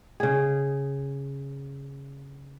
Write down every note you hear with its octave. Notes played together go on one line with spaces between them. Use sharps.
C#3 G#4